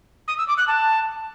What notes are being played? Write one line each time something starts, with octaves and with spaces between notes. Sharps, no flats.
D#6
E6
D6
F#6
A5